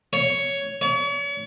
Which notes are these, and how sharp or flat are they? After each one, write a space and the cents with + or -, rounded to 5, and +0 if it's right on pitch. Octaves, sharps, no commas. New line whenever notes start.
C#5 +5
C#5 +40